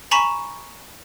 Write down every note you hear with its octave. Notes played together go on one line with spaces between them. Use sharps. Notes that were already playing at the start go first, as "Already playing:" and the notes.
G#5 A#5 B5 C#6 B6 E7